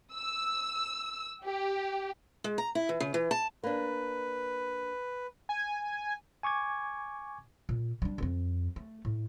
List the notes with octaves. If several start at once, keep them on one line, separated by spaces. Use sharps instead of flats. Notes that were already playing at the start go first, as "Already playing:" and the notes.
E6
G4
G#3
A#5
E4
E3
C#3
E3
A5
A#3 D4 B4
G#5
G#5 C#6 D6 G#6
A#2
G3 D4
D#1 F2
A3
A2